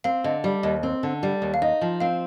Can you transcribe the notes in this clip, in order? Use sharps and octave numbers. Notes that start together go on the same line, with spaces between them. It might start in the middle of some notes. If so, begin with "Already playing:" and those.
C4 F5
D3 D#5
G3 D5
D#2 D#5
C4
D3
G3
D#2
F5
D#4 D#5
F3
C4 F5